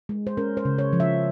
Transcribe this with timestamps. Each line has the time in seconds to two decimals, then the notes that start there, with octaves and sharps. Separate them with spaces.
0.09 G#3
0.27 C5
0.37 C#4 A#4
0.57 C5
0.65 C#3
0.78 C#5
0.93 F3
1.00 E5